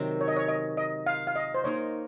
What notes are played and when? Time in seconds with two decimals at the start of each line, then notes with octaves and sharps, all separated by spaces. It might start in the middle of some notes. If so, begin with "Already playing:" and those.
Already playing: C3 D#3 F#3 C4
0.21 C#5
0.28 D#5
0.36 C#5
0.48 D#5
0.77 D#5
1.06 F5
1.27 F5
1.36 D#5
1.54 C5
1.64 A#3 D#4 A#4 C#5